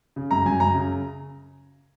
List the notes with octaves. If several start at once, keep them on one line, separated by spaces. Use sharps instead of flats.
C#3
F#2 A#5
F#2 G#5
F#2 A#5
C#3